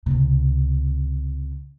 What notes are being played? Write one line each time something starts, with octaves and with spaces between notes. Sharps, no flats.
C#2 C3